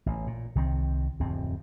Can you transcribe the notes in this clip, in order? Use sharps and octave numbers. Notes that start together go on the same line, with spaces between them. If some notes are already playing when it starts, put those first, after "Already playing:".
A1
A#2
C2 D#3 F#3 C4
D1 F2 C4